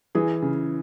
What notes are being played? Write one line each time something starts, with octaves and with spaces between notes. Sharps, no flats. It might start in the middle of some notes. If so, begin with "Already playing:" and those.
E3 G#4
C#3